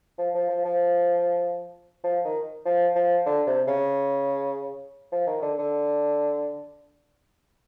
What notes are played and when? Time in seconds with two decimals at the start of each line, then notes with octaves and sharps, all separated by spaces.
0.18 F3
0.34 F3
0.50 F3
0.65 F3
2.04 F3
2.25 D#3
2.65 F3
2.96 F3
3.26 D3
3.47 C3
3.67 C#3
5.12 F3
5.27 D#3
5.42 D3
5.59 D3